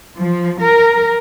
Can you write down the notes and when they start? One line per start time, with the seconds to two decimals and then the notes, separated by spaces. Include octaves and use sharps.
0.19 F3
0.61 A#4